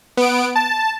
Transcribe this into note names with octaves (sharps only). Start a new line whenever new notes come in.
B3 D7
A5